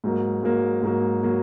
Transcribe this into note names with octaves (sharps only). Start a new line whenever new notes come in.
G#2 F#3 A#3
G#2 F#3 A#3
G#2 F#3 A#3
F#3 A#3